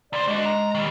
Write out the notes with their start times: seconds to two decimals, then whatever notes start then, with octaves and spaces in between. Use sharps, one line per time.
0.13 D2 C5 D5
0.28 G#3 D4 F#4
0.45 A#5
0.75 D#3 G3